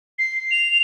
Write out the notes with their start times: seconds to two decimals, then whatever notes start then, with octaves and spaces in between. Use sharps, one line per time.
0.19 C7
0.51 F7